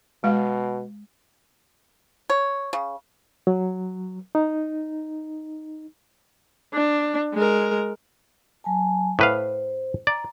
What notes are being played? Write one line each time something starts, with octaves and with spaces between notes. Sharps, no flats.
B2 G#3 F5
C#5
C#3
F#3
D#4
D4
G#3 A#4
F#3 G#5 A5
A2 B4 C5 F5
D5 A#5